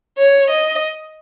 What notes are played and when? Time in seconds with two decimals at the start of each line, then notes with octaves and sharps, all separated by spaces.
0.18 C#5
0.50 D#5